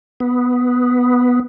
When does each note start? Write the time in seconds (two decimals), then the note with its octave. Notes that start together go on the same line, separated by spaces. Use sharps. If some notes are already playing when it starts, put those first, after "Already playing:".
0.20 B3